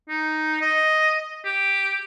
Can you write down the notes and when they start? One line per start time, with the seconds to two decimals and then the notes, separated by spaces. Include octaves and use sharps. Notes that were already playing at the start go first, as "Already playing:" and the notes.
0.09 D#4
0.61 D#5
1.45 G4